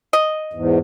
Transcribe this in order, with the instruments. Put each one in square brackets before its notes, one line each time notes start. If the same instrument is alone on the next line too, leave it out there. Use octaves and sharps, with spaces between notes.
[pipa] D#5
[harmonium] E2 G#2